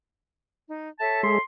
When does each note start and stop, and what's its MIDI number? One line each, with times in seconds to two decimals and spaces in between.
0.68 0.88 63
1.00 1.37 69
1.00 1.37 73
1.00 1.37 76
1.00 1.22 81
1.23 1.38 56
1.23 1.38 68
1.23 1.41 84